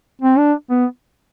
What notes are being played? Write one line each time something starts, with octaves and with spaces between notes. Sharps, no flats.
C4
D4
B3